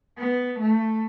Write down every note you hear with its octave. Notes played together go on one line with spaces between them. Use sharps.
B3
A3